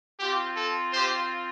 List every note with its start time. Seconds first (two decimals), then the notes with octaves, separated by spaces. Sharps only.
0.20 C4 F4 G4
0.57 A4
0.93 G4 C5